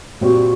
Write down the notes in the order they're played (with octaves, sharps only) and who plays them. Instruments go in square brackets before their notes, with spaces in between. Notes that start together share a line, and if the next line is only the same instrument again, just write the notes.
[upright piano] A#2 G3 C4 [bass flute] F#4